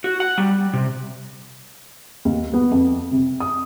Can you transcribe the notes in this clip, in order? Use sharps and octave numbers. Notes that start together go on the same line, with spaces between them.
F#4
F#5
G3
C3
D#2
B3
F2
C3
D#6